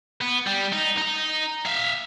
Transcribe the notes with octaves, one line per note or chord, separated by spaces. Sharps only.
B3
G3
D#4
D#4 A#5
E5 F5